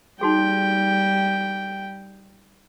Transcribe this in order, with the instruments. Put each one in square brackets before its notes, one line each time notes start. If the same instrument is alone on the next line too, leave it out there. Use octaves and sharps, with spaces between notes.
[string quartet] G3 [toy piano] D#4 F#4 G#4 [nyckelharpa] G5